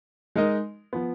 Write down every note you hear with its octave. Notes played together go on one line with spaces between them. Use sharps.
G#3 D#4 A#4 D#5
F3 B3